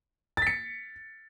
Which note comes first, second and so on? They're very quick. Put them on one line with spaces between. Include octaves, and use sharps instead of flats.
A6 B6 C#7